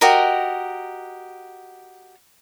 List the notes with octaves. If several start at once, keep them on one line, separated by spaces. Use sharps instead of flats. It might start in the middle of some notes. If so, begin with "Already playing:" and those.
F#4 G4 A#4 D#5